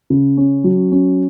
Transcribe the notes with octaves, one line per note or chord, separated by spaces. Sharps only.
C#3
C#4
F#3
C#4